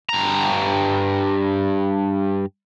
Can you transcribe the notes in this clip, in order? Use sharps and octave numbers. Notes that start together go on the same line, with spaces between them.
G2 A#5